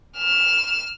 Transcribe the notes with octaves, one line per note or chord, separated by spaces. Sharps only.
F6 E7